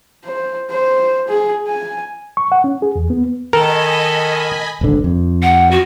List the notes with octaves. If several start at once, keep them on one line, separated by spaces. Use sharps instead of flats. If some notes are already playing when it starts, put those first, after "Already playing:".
C5
C5
G#4
G#5
C#6
F#5
C#4
G#4
E2
B3
D#3 A4 A#4 D#5 G#5 B5
D#1 G#1 D3
F2
F#5
F#4